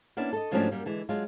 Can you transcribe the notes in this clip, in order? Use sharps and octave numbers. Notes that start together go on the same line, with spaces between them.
A#3 B3 C#4 D4 E4
A4 D#5
G#2 F3 F#3 A3 C#4 D4
F#2 G3 A#3
D3 E3 G#3
F#3 G#3 D4 F4